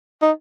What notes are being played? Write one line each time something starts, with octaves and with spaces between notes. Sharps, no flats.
D#4